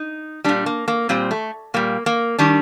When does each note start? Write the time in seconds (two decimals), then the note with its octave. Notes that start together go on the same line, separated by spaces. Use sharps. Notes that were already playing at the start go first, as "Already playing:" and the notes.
Already playing: D#4
0.44 A#2 G3 D4
0.66 A#3
0.88 A#3
1.09 A#2 G3 C4
1.31 A3
1.74 A#2 G3 A#3
2.06 A#3
2.39 D#3 G3 D4